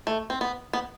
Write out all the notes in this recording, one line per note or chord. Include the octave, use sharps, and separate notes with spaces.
A3
C4
B3
B3